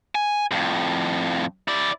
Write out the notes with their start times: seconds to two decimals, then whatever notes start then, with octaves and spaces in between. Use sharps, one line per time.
0.15 G#5
0.51 F2 A2
1.68 E4 D5